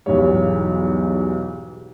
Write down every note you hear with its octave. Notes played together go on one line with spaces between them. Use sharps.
B1 E2 G#2 G3 C#5